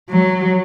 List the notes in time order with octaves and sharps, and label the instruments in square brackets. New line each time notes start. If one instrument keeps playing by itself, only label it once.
[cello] F#3